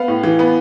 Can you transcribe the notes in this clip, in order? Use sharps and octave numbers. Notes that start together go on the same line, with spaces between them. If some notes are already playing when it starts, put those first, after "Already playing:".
Already playing: B3 F5
A2
E3
B3